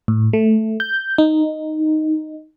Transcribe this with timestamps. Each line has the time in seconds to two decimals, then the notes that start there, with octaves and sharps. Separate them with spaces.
0.08 A2
0.33 A3
0.80 G6
1.18 D#4